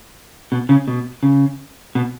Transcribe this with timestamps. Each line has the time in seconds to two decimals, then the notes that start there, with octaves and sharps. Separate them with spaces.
0.52 B2
0.69 C#3
0.88 B2
1.23 C#3
1.95 B2